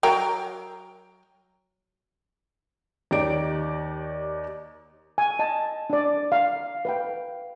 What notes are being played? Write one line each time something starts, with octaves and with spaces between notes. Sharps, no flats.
F#3 A#4 G5
D#2 D#4 G4 C#5 D5 D7
G#5
D#5 A5
D4 D5
F5
B4 F5 G5